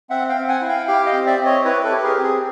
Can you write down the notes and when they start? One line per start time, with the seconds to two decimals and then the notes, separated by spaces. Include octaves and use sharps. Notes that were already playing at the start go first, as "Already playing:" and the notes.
0.10 C4 E5 F#5
0.29 F5 G5
0.36 C4
0.48 F#5 G#5
0.61 E4
0.68 F5 G5
0.87 G4 F5 G5
1.06 D#5 F5
1.13 C4
1.26 D5 E5
1.39 C4
1.45 C#5 D#5
1.65 E4 B4 C#5
1.84 A4 B4
1.91 G4
1.97 B4
2.04 G#4 A#4
2.17 C4
2.23 G#4